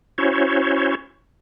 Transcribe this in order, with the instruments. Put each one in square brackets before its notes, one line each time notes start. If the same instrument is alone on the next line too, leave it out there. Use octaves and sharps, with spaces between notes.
[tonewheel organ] C#4 E4 F#4 C5 C#5